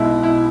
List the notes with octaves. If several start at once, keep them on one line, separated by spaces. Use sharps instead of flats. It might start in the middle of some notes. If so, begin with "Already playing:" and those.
Already playing: B1 B2 G#3 D#4 E4
E4